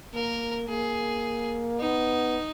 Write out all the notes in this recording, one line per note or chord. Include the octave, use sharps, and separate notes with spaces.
A#3 A#4
A#3 G#4
B3 D#4